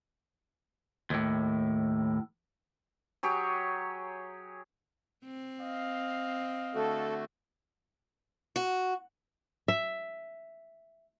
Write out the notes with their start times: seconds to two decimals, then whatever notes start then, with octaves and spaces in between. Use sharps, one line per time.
1.10 D#2 A2
3.23 F#3 G4 G#4 C#5
5.25 C4
5.61 D#5 F5
6.75 D3 A3 F#4 A4
8.56 F#4
9.68 E5